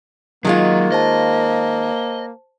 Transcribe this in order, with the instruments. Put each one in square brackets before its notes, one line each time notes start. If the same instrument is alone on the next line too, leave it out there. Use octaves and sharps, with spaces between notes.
[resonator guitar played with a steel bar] D#3 G#3 F4 [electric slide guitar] F#3 [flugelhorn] A#3
[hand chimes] C5 A5 [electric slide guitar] D#5